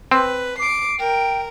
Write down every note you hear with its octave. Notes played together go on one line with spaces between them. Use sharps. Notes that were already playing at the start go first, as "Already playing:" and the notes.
C4 B4
D6 C7 D7
A#4 G5